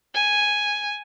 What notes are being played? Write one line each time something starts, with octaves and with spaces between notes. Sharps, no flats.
G#5